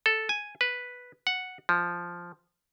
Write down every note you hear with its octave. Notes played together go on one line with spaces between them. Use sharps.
A4
G#5
B4
F#5
F3